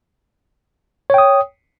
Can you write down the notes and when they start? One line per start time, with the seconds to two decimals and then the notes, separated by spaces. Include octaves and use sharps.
1.10 C#5
1.14 G5
1.18 D#6